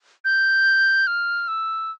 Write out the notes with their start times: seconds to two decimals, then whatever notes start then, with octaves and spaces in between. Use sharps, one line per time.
0.25 G6
1.07 F6
1.48 E6